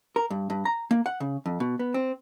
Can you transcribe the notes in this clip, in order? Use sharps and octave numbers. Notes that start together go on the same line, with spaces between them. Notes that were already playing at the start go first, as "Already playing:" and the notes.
A#4
G2
G2
A#5
A#3
F#5
C#3
F2
B2
B3
C4